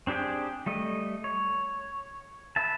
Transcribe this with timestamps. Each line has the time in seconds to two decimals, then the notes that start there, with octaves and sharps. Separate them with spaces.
0.07 C4 D4 G4 G#4 G5
0.66 G3 A3 D#5
1.24 C#5
2.56 B4 E5 A5